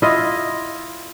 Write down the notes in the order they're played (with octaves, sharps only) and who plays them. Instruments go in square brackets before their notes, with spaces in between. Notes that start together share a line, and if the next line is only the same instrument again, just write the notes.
[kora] E4 F4 D#5